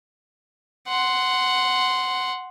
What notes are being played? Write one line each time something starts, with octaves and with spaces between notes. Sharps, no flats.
F#5 C6